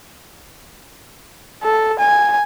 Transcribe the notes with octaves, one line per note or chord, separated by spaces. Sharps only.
A4
G#5